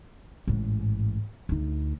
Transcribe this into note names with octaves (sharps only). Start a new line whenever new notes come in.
A1 G#2
D2 D#4